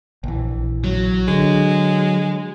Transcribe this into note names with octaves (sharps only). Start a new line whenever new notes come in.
A#1 E3
F#3
D3 G#3